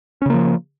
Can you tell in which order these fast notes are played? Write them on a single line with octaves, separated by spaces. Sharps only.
C#4 C#3 A#3 F3